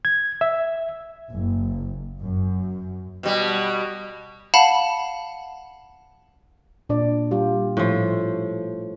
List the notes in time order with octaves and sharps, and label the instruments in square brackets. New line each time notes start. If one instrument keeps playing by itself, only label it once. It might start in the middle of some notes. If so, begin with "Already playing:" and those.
[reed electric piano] G#6
E5
[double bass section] F#1
F#2
[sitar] B2 G3
[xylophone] F5 F#5 A5 B5
[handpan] A#2 D4 D5
G3 F4 G4
[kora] A2 F3